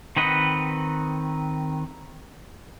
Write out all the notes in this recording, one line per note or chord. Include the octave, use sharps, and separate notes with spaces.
D#3 C4 B4 D#5 F#5